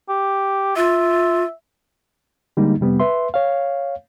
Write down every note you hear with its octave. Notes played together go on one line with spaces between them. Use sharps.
G4
F4 E5
D3 G3 G#3 A#3 D#4
F2 C3 G3 B3 C4
B4 E5 C6
C#5 F5